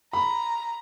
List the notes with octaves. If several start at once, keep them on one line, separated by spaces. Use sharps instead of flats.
A#5 B5